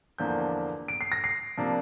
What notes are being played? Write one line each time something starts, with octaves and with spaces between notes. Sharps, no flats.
E2 D3 F3 A#3 D4 G6
D7
C7
A#6
C7
C3 F3 A#3 D4